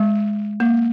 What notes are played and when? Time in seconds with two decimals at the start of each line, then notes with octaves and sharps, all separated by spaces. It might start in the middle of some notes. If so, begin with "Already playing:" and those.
Already playing: G#3
0.60 A#3